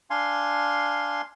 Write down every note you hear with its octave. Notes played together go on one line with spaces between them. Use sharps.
D4 F5 G#5 C6